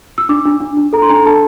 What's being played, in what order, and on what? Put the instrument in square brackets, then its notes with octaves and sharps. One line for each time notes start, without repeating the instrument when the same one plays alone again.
[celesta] E6
D4 D6
D4
D4
D4
A4 A#5
C6
D4 A#5
A4 A5